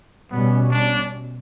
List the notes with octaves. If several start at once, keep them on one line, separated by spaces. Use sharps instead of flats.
B2 G3 B3 C#4
D4